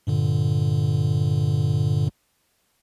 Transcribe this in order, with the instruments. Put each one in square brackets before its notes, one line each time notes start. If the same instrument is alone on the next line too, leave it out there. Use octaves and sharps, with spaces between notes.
[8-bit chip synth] G2 A#2 D3